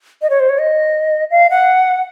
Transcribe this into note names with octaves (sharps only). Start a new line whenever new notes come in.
D#5
C#5
C5
C#5
D#5
F5
F#5